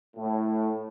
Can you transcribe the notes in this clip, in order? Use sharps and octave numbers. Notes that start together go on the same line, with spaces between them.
A2